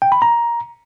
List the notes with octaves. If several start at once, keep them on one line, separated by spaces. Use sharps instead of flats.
G5
B5
A#5